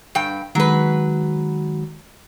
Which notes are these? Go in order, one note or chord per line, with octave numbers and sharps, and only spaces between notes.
G2 G5
D#3 F#3 G#3 B4